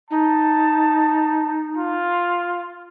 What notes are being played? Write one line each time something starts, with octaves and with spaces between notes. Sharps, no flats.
D#4 A5
F4